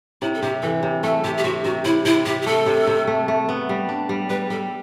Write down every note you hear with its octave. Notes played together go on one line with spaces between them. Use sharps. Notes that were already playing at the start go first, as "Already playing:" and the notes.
C3 E4
A4
C3 G4
E3 A4
C3
A3 A4
C3 G4
G4
C3 F#4
C3 F#4
C3 E4
C3 E4
C3 G4
G4
A3 A4
C3
C3
A3
A3
B3
G3
D4
G3
G3 B4
G3 A4